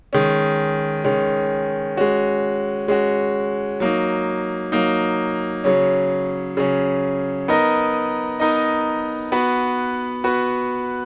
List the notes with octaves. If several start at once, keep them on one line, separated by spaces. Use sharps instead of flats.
D#3 G#3 C#4
D#3 G#3 C#4
G#3 C#4 F#4
G#3 C#4 F#4
F#3 A#3 D#4
F#3 A#3 D#4
C#3 F#3 C#4
C#3 F#3 C#4
B3 D#4 A#4 D#5
B3 D#4 A#4 D#5
B3 F#4 B4
B3 F#4 B4